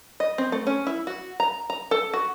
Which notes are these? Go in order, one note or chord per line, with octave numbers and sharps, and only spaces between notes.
D#5
C4
A3
C#4
E4
F#4
A#5
A#5
A4
F#4